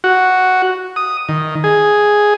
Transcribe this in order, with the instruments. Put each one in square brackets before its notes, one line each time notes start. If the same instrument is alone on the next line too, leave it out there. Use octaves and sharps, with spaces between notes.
[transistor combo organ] F#4
D#6
D#3
G#4